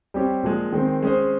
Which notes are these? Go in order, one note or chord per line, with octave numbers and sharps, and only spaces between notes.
G3 C4 G4 C#5
A#2 F3 G#3
D#3 G#3 C4
G#3 C#4 G#4 C5